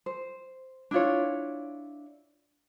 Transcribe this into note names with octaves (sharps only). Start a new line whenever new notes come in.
C5
D4 E4 F4 C#5